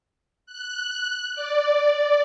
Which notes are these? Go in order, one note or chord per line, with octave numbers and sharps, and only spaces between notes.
F#6
D5